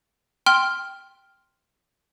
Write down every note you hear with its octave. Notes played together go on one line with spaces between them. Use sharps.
G5 C6 F6